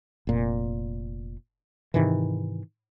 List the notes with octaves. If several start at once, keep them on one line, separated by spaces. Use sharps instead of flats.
F1 A#2
G#2 C3 D#3 E3